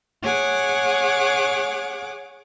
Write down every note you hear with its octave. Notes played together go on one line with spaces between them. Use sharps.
G#4 C#5 F#5 D6